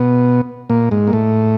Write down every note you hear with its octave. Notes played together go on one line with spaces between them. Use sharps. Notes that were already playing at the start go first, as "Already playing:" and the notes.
Already playing: B2 B3
A#2 A#3
G#2 G#3
A#3
A2 A3